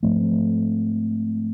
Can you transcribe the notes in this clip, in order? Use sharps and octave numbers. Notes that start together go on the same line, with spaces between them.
G#2 F3 A3 C4